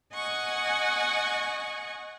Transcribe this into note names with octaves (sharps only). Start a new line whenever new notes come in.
D#5 F#5 G#5 C#6